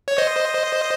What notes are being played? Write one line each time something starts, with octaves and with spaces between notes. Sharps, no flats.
C#5
C5 D#5